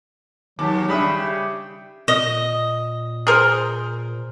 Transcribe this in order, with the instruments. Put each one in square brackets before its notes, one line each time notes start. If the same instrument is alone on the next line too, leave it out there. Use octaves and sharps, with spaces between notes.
[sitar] D#2 [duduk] F#3 [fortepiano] G4 A5 D6
[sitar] C#3 E5 [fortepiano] G3 B5 D#6 [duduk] D4
[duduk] G4
[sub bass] A#2 [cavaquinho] D#5
[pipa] G#4 A#4 C5